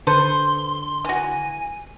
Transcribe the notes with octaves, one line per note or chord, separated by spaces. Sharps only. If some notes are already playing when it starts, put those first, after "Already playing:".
D3 A4 B4 C5 C6
E3 F#4 G#5